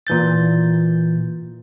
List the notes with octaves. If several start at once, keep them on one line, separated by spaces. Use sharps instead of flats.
A#2 E3 G6 A6